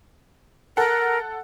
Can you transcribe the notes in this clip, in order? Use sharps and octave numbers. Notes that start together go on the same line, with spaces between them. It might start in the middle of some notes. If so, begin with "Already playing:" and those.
A4 A#4 F#5